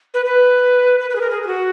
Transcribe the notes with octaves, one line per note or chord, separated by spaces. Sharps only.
B4
B4
B4
B4
G#4
A#4
G#4
G#4
F#4